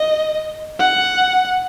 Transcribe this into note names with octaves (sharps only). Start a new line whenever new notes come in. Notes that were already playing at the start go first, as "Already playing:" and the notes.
Already playing: D#5
F#5